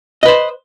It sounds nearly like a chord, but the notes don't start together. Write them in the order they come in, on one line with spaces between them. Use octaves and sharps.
D#5 B4 C5